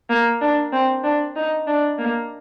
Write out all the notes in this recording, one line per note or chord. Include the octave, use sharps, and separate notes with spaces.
A#3
D4
C4
D4
D#4
D4
A#3